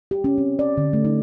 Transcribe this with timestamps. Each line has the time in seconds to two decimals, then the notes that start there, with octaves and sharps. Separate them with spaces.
0.11 G4
0.24 C#4
0.38 C4
0.59 D5
0.77 D3
0.93 A3
1.05 D#4